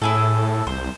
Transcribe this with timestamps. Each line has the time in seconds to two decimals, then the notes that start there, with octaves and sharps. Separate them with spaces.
0.02 A2 E4 G#4 A4
0.67 C2 C5